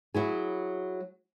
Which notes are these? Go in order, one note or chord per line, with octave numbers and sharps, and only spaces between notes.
F#3 E4 G#4